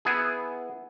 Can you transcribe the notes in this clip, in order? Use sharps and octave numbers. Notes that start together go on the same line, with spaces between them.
B3 E4 G#4